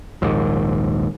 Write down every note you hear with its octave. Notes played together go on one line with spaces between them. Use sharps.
A#1 D#2 G#2